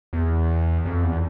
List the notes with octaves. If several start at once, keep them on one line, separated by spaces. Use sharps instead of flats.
E2
F2
E2